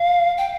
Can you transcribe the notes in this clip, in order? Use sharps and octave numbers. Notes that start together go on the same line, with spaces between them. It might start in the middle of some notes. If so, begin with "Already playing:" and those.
Already playing: F5
G5